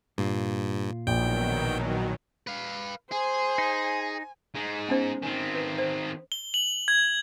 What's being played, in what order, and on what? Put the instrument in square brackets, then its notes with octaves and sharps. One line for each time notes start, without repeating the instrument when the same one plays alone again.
[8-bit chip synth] G2 [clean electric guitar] A#2 F4
[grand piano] A#1 [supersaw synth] B2 D#3 F#3 [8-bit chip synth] G5
[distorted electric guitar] B4 F5
[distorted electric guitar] G#4 [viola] C5 [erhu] G#5
[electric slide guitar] D#4
[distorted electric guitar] G#3 D#4
[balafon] B3 C#4 C5
[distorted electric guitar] D#3 C4 [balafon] G#5
[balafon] B4
C5
[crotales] G7
F#7
G#6